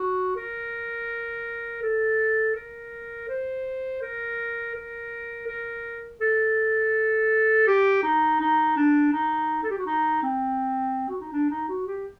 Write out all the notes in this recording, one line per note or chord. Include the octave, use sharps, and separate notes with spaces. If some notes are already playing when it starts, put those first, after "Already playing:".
Already playing: F#4
A#4
A4
A#4
C5
A#4
A#4
A#4
A4
G4
D#4
D#4
D4
D#4
A4
G4
F#4
D#4
C4
F#4
D#4
D4
D#4
F#4
G4